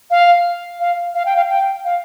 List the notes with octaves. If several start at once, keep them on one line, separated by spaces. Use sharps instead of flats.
F5
F5
F5
G5
F5
G5
F5